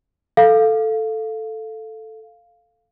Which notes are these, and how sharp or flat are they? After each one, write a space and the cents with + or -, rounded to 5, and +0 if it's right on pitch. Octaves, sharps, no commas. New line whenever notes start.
A4 +0 F5 +0